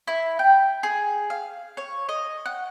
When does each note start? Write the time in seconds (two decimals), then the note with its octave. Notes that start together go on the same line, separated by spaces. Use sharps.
0.07 E4
0.39 G5
0.83 G#4
1.30 F5
1.77 C#5
2.09 D#5
2.46 F#5